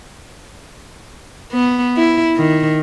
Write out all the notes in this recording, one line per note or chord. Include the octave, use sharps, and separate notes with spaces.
B3
E4
D#3